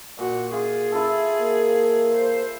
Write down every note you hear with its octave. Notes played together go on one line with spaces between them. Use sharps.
A#2 F#4
F4 G#4
E4 F4 A4
A#3
C5